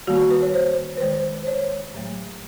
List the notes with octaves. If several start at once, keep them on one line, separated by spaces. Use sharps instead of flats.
D#3 G3 A#3 F#4
B4
C#5
C5
C5
B4
D#3 G#3 C5
C5
C#5
A2 F#3 A3